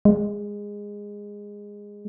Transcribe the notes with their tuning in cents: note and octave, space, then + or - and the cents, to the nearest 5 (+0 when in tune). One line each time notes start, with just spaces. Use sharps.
G#3 -15